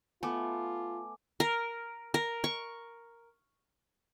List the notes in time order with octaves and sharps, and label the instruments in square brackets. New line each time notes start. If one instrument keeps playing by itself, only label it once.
[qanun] A3 B3 [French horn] F4 [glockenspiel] G#5 D6
[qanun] A#4
A#4
C#6